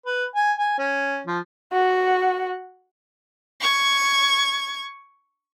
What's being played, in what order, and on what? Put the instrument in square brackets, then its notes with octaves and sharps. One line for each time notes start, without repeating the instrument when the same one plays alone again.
[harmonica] B4
G#5
G#5
C#4
F3
[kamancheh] F#4 F#5
[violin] C#6 G#6